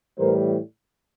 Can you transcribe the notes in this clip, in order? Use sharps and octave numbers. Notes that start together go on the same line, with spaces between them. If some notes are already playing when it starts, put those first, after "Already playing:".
A2 E3 G3 A#4 C5